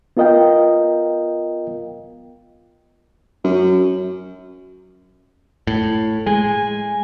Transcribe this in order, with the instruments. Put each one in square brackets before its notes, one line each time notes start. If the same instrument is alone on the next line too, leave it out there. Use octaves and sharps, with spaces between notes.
[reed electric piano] B3 F4 A#4 D#5 F5 G5
[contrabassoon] F#2
[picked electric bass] A2
[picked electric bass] G#3 [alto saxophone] G#5